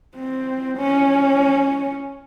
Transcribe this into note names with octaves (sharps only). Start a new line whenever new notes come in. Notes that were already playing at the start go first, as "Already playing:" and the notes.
C4
C#4